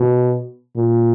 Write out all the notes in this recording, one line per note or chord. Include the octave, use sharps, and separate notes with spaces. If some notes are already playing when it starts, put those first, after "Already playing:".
Already playing: B2
A#2